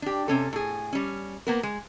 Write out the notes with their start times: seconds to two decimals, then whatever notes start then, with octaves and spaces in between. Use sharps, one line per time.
0.02 D4 G4
0.28 C3 C#4 A4
0.53 A2 G#4
0.93 G3 C#4
1.47 A#3 B3 A#4
1.63 G#3